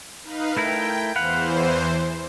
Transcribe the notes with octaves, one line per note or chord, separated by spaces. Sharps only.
D#4 B4 F5
A3 E4 A#4 G5
E2 E3 B4 C5 F5 F#5